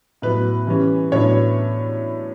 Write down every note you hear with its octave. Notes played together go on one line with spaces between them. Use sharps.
A2 F#3 B3 B4
E3 G3 C#4
A2 F#3 B3 D4 C#5